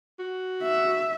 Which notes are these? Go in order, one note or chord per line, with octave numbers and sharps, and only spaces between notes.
F#4
E5